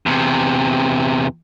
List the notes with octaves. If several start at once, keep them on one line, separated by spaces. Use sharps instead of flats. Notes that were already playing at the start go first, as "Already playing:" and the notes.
E2 C3